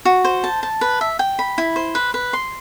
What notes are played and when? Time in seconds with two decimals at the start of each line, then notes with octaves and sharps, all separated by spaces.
0.05 F#4
0.25 C5
0.44 A5
0.63 A5
0.81 B4
1.01 E5
1.19 G5
1.39 B5
1.58 E4
1.76 C5
1.95 B4
2.14 B4
2.33 C6